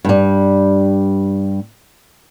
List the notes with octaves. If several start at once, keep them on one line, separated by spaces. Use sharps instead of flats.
G2 G3